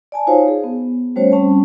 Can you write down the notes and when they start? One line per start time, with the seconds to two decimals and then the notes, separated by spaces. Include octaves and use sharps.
0.12 D5 G#5 A5
0.27 D#4 F4 F#4 C5 C#5 F5
0.48 G#4
0.64 B3
1.16 G3 A3 C#4 F#4 C5 C#5
1.32 G3 C4 C#4 A5